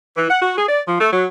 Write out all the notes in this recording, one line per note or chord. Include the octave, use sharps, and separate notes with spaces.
E3
F#5
F#4
G#4
D5
F3
A3
F#3